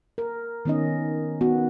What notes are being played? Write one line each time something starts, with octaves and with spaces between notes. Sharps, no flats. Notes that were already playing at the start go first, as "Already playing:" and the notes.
A#4
D#3 B3 C#4 D#4 D#5
B3 F#4